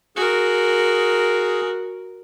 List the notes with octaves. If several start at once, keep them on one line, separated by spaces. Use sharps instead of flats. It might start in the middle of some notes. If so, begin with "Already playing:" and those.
F#4 G#4 A#4